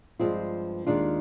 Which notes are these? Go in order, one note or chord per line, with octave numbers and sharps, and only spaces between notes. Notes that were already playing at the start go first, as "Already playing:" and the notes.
G2 F3 G#3 C4 F4
D#2 D#3 G#3 D4 F4